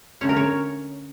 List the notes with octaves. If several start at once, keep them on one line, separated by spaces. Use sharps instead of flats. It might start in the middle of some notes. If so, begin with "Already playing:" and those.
D3 A3 C#4 C#5
A#4
C#5